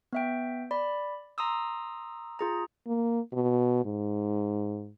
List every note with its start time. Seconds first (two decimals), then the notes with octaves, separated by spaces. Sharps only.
0.13 B3 E5 G5
0.71 D5 B5
1.38 A#5 C6 D#6 E6
2.39 F4 G#4 A#5
2.87 A#3
3.33 B2
3.85 G#2